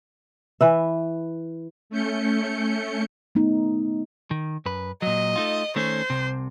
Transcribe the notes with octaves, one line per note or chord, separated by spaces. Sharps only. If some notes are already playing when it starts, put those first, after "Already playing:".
E3 B4 E5
A3 C#4 G6 C#7
A3 B3 D#4
D#3
F#2 B4
A#2 F#3 D#5
A3 D#4 F4
D#3 A3 C#4 C5
C2 C3